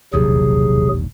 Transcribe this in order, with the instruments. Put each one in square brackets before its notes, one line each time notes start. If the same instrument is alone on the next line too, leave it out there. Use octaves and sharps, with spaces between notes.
[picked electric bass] E1 A#1 D#2 [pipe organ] C3 F#3 G#4